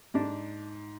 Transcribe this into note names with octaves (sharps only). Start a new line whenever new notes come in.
G#2 D4